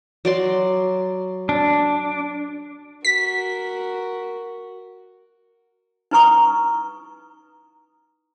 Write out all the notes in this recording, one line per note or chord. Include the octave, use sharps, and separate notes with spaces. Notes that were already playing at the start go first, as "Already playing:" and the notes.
F#3 D5 C6
D4
F#4 A#4 B6
D#4 E4 B4 A#5 C#6 D#6